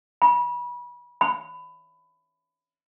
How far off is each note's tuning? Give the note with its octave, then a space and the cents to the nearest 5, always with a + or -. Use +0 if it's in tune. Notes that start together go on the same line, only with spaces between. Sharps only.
B5 -30
B5 +20